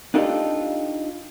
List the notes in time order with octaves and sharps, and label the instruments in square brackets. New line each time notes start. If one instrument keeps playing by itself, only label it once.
[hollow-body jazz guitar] D4 D#4 F4 G4 A4